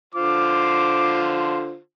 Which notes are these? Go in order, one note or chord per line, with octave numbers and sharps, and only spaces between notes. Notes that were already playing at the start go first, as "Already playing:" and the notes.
D3 F4 C5 D6